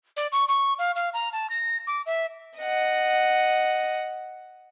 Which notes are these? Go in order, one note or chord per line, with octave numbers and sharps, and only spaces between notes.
D5
C#6
C#6
F5
F5
A#5
A5
A#6
D6
E5
D#5 F#5